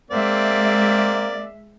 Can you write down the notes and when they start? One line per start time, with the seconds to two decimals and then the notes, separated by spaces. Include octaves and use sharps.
0.11 G#3 A#3 C4 D5 E5